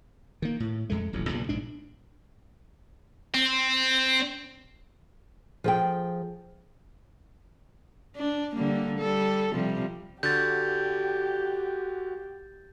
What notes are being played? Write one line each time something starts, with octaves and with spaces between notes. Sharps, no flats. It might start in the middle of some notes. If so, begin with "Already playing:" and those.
D#3 A#3
A2
F2 G#3 A3
D#1 A1 F2 F#3
B1 G2 A#2 C#3
A#1 G#2 D4
C4
F3 G#4 G5
D4
D3 G3 A#3
G3 A4
C3 F3 G3
D3 F#4 G4 G6 A6